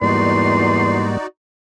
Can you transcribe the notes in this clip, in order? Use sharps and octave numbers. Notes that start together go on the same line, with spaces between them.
E2 G#2 G3 A#3 D#4 F#4 D5 C6